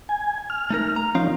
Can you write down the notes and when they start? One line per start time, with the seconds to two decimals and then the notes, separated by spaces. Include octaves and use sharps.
0.09 G#5
0.50 F6
0.71 A3 D#4 A#4
0.96 A#5
1.15 F3 C4 C#4 D#4 F5